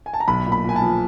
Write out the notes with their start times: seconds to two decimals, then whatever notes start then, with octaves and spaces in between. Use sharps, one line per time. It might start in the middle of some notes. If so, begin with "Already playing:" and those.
0.06 G#5
0.14 A5
0.20 A#5
0.28 B1 B5
0.46 A#2
0.52 B5
0.64 A#2 G#5
0.76 A5
0.82 F3